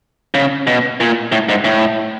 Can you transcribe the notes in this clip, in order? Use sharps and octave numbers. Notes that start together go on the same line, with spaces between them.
C#3
B2
A#2
A2
G#2
A2